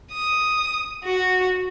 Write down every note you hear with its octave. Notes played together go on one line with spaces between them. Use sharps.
D#6
F#4